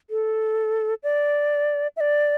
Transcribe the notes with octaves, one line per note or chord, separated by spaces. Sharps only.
A4
D5
E5
D5